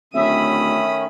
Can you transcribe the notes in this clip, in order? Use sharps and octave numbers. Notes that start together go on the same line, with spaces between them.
D1 D#3 A3 C#4 E5 B5 D#6